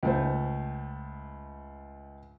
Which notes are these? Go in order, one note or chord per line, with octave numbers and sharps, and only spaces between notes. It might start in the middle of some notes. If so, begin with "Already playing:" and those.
C#2 A3 C5